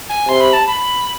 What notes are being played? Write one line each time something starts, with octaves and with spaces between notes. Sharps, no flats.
G#5
C3 C6
B5
A5
B5